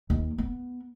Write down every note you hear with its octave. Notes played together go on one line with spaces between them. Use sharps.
D#2
B3